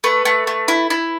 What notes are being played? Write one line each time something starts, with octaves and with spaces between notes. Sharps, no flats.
A3 B4
A3
A3
E4
E4